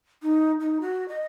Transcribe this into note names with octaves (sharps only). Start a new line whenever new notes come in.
D#4
D#4
F#4
D#5